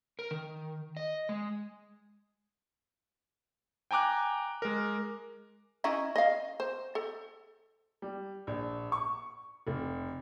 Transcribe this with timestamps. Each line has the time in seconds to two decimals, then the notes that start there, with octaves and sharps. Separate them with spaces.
0.19 A#4
0.31 D#3
0.97 D#5
1.29 G#3
3.91 G5 G#5 A#5 D6 F#6
4.62 G#3 A#4
5.84 C#4 D#4 E4
6.16 D#5 F5
6.60 C5
6.95 A4
8.02 G3
8.47 A#1
8.92 C#6
9.67 F1